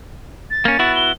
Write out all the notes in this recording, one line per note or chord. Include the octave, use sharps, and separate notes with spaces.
A6
A#3 C#4
B3 E4 F#4
G7